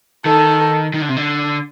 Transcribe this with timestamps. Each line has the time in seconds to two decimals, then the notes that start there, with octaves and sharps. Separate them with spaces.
0.25 D#3 A4
0.94 D#3
1.01 D3
1.09 C3
1.17 D3